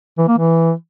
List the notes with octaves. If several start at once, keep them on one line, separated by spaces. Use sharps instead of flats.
E3
A#3
E3